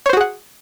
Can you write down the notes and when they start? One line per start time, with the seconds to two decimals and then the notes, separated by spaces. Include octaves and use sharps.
0.06 C#5
0.09 C5
0.13 F#4
0.17 G#4
0.21 F#5